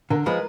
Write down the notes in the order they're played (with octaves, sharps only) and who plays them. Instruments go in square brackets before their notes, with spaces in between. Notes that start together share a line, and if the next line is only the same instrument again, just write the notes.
[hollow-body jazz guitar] D3 [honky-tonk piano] A#4
[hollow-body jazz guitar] F3 G#3 [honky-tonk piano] B4